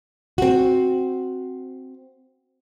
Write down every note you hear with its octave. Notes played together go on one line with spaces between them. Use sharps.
C4 F#4